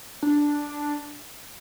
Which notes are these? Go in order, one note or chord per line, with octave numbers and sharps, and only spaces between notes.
D4